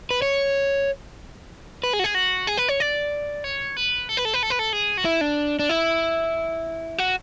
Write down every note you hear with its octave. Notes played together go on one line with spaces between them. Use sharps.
B4
C#5
B4
G#4
F#4
G#4
F#4
G#4
B4
C#5
D5
C#5
B4
A4
B4
A4
B4
A4
B4
A4
G#4
F#4
E4
D4
D4
E4
F#4